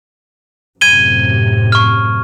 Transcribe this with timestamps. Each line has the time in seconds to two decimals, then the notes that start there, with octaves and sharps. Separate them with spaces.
0.81 F#2 A2 C3 G#6 D#7 G7
1.72 C#6 F6